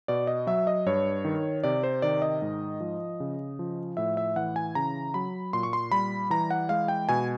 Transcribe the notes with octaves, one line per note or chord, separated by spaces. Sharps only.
B2 D5
D#5
F#3 E5
D#5
G2 C#5
D#3
C3 D5
C5
D#3 D5
D#5
G#2
F3
C#3
F3
A2 E5
E5
E3 F#5
G#5
C#3 A#5
F#3 B5
A#2 C6
C#6
C6
G3 B5
E3 A#5
F#5
G#3 F5
G5
B2 G#5